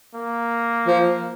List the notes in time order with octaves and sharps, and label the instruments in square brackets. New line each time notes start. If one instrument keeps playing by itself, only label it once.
[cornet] A#3
[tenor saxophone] F3